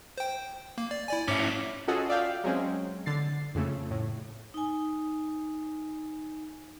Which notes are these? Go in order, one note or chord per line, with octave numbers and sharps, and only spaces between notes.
C5 G5
A#3
D5
E4 D5 G#5
G#2 C#4 E4 D6
C#4 F4 F#4 G#4 A4 D#5
D5 E5 F5 G5
F#3 G#3 C4 C#4
D3 A6 C7
F2 C#3 A3
A2
D#4 G#5